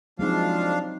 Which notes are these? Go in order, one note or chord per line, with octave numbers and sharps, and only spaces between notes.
F3 F#3 G#3 C4 D4 D#4 F5